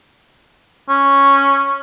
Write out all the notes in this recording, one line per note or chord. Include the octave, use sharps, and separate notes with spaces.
C#4